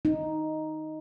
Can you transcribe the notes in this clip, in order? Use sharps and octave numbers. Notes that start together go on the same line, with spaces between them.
D#4